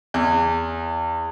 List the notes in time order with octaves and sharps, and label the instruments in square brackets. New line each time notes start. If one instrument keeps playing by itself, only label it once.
[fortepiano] E2